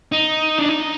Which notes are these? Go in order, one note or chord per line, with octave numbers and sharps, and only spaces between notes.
D#4
D4
D#4